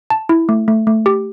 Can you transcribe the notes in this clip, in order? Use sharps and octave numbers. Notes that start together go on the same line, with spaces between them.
A5
E4
A3
A3
A3
G4